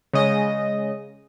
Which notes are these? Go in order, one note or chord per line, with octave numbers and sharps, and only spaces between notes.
C#3 G#3 D#5